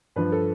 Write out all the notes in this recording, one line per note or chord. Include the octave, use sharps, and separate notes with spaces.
G2 F3 B4
A4